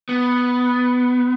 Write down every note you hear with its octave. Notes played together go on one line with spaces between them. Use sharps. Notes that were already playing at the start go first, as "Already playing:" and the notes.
B3